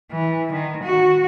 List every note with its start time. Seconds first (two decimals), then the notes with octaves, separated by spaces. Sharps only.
0.12 E3
0.53 D#3
0.84 F#4